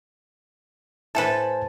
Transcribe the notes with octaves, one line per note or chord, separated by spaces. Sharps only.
A2 A4 B4 C5 G#5 A5